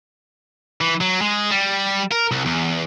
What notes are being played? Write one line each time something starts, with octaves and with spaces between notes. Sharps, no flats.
E3
F#3
G#3
G3
A#4
C2
E2